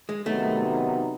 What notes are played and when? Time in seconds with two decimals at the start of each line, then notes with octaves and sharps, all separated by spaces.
0.09 G#3
0.26 C3 D#3 F#3 A3 B3 D#4